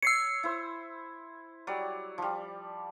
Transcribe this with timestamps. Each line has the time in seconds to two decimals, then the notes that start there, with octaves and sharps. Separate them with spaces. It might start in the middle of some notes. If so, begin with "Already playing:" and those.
0.02 C#5 E6 C7 C#7
0.43 E4 C5
1.67 F#3 G3 D5
2.18 F3 G3